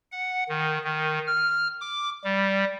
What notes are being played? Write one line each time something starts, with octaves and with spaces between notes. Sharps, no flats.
F#5
D#3
D#3
F6
D6
G3